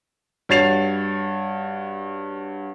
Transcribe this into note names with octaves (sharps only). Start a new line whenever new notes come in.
G2 F#4 C#5 A6 C7 F7